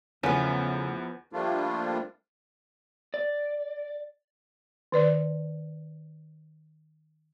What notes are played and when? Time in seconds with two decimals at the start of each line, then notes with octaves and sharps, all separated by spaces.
0.23 E2 C#3 F3 A3 B3 C#4
1.33 F3 G3 A3 A#3 D4 F4
3.14 D5
4.92 D#3 B4 D5